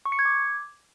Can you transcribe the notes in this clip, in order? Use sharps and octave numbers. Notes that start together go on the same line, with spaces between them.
C#6
C#7
G#6
D6